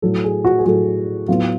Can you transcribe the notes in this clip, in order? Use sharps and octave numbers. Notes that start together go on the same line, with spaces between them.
A2 F#3 A3 A4
G#4
F#4
G#4
A2 F#3 A3 F#4
A2 F#3 B3 F4